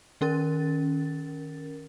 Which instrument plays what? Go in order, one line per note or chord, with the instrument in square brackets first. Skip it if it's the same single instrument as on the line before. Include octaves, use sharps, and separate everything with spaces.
[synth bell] D#3 C#4 A#4 A6